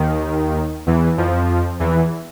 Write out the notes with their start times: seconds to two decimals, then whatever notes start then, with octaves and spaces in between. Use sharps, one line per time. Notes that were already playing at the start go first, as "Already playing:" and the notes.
Already playing: D#2 D#3
0.87 E2 E3
1.17 F2 F3
1.80 E2 E3